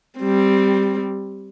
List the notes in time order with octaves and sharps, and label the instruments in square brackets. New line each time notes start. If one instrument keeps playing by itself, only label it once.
[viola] G3 C4